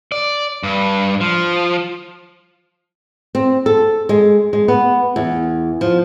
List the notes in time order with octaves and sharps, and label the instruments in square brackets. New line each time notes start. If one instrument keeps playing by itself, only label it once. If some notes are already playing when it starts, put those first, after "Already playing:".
[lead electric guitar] D5
G2
F3
[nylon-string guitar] C4
A4
G#3
G#3
B3
E2
F3